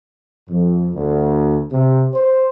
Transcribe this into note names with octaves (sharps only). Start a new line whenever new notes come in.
F2
D2
C3
C5